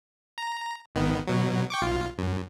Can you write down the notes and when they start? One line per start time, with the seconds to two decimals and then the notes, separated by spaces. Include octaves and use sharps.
0.38 A#5
0.95 G#1 D#3 B3
1.27 B2 F#3
1.70 G5 C#6 D6
1.82 B1 F4
2.18 F#2